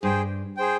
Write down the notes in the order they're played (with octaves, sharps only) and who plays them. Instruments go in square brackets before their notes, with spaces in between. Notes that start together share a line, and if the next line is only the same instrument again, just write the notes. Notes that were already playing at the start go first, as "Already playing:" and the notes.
[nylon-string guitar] G2 [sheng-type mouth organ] G#4 C5 G5
[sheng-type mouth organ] G#4 C5 G5